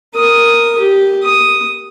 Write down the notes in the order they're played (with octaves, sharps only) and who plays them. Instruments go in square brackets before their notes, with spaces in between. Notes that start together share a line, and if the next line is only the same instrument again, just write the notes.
[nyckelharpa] A#4 D#6
G4
D#6